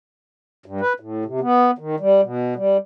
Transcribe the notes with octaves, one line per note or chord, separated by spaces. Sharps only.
G2
B4
A2
C3
B3
D#3
G3
B2
G3